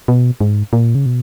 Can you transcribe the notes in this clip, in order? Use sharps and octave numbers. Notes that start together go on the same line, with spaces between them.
B2
G#2
A#2
C#3
B2